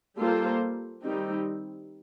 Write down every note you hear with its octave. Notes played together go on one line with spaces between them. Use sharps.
G3 A#3 F4 A4 C5
D#3 G3 C4 D#4